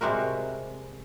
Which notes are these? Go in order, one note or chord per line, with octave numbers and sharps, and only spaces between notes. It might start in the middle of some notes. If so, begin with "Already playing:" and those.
C3 G3 G#3 F#4 A#4